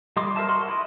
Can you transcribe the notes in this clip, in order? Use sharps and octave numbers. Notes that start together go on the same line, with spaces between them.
G3 D#5 C6 D6
A#4 C5 E5 A5
F#4 A#4 C6
E4 D#5